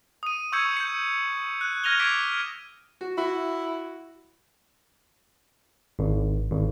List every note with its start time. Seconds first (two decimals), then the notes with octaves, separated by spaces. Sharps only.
0.23 D#6 D#7
0.52 C#6 E6 G6 G#6 C#7 D#7
0.77 G6 C#7
1.61 F#6
1.84 F6 G#6 A#6 D#7 F7 G7
1.99 D6 G#6 B6 D7 F7
3.01 F#4
3.18 E4 F#4
5.99 G#1
6.52 G#1